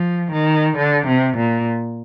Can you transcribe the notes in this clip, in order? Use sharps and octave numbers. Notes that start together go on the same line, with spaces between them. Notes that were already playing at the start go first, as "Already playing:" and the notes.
Already playing: F3
D#3
D3
C3
A#2